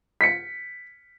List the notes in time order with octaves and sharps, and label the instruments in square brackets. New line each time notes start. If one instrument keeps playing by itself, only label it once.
[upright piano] B6 C#7